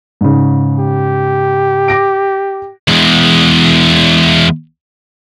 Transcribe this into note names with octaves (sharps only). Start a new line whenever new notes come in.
G#2 C#3
G4
D6 A#6 D7
E2 G#3